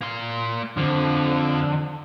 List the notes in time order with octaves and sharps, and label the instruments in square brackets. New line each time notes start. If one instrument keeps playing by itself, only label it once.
[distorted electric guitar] A#3 C6
[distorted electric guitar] F2 F3 [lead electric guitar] D3